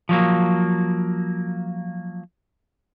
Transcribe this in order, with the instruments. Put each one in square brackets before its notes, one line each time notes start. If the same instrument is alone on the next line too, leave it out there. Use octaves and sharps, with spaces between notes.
[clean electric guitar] F3 F#3 A#3